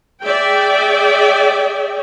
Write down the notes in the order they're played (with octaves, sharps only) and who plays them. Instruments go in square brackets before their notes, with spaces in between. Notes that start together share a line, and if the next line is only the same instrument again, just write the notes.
[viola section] G#4 D5 E5 G5